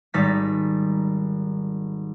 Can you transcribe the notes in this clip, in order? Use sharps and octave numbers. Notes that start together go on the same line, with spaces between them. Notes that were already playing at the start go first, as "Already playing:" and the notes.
G#1 G3 D#4 A6 B6